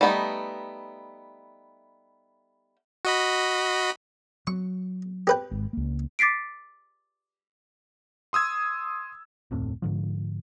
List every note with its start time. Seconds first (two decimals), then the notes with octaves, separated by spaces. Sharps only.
0.01 G3 A3 B3 D#4
3.05 F#4 D#5 B5
4.47 F#3 C#6
5.27 G4 B4 G5
5.51 G#1 G#2
5.73 C#2 A#3
6.19 D6 A6 B6 C7 D7
8.33 C6 D#6 E6 G#6
9.51 F1 D2 A2 C4
9.82 G#2 D3 F3